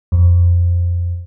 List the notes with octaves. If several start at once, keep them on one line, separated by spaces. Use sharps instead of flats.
F2